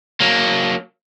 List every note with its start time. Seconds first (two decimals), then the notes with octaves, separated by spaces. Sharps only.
0.20 F#3 A#3